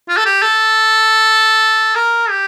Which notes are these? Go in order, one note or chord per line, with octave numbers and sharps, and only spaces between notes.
F4
A4
G4
A4
A#4
G4